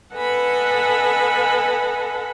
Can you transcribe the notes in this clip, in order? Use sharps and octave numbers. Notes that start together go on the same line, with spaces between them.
A4 B4 D#5 F#5 G#5 B5